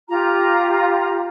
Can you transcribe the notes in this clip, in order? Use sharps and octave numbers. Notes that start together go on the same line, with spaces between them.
F4 G4 A#5